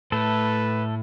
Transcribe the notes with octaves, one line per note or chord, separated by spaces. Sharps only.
A2 A3 A4 B4